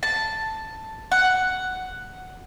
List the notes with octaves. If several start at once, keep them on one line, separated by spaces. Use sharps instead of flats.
A5
F#5